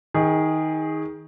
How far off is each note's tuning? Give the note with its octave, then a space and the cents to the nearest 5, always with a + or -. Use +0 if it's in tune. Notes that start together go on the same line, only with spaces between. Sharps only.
D#3 +20 G#4 -10